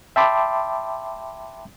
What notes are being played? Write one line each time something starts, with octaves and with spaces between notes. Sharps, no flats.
E5 G5 A5 B5 C6 D6